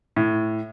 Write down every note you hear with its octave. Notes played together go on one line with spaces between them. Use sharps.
A2